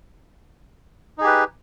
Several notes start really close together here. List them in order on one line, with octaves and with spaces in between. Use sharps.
D#4 G#4 G4 B4